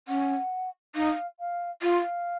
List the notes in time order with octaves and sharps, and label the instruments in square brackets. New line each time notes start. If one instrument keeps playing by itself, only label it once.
[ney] C#4 [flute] F#5
[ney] D#4 [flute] F5
[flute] F5
[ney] F4 [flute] F5